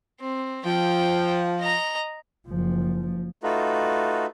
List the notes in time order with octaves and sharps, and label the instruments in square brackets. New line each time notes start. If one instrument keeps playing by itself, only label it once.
[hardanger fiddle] C4
[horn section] F3 [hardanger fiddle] G5
[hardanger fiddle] D#5 A#5
[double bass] F#1 F3
[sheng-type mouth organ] A3 D#4 F4 F#4 A4 B4